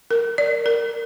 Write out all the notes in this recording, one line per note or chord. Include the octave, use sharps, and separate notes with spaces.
A#4
D5
A#4